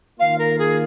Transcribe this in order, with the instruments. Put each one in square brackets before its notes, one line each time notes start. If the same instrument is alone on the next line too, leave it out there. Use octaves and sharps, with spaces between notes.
[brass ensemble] D#3 A#3 F4 [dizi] F5
[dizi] A#4
G#4